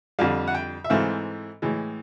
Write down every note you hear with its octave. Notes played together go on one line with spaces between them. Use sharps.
F2 D3 G3 F5
F#5
G5
E5
G#2 E3 A3 C4 F5
A2 E3 G#3